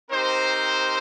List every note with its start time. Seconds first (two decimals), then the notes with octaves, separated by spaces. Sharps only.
0.10 C4 D#4 G4 A#4 C5